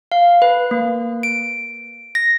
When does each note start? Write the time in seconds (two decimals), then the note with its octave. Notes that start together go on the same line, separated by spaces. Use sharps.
0.12 F5
0.42 B4
0.71 A#3
1.23 D7
2.15 A#6